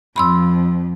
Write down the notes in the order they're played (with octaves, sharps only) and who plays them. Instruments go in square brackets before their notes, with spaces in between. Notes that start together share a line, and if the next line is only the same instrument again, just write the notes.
[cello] F2 [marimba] B5 C6 E6